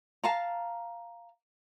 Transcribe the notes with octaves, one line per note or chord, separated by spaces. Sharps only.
F5 A5 A#5